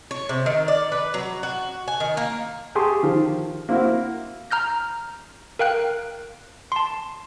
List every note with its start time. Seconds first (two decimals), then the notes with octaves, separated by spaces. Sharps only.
0.11 C#5
0.29 C3
0.46 D#3
0.68 D5
0.92 B4
1.14 F#3
1.43 F#4
1.88 G#5
2.00 D#3
2.17 A#3
2.75 G4 G#4 A5 C6 C#6
3.03 D#3 F3
3.69 A#3 C4 E4 F#4 A#4
4.51 A#5 F6 G6 A#6
5.59 A#4 F5 G5 F#6
6.72 A5 C6